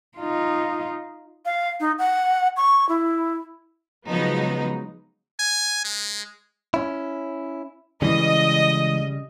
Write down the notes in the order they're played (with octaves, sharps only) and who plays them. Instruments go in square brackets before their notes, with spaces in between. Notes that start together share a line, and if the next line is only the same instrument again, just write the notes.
[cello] D#4 F4
[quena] F5
D#4
F#5
C#6
E4
[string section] C#3 F3 F#3 G#3 B3 D#4
[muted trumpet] G#5
G#3
[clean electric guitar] C#4 E4
[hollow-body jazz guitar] C#2 E3 [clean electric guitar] C#3 G3 [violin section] D#5